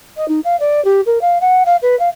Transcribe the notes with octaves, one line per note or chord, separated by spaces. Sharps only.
D#5
D#4
F5
D5
G4
A#4
F5
F#5
F5
B4
F5